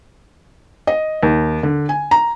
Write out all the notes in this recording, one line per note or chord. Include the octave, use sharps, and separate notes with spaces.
D#5
D#2
D3
G#5
A#5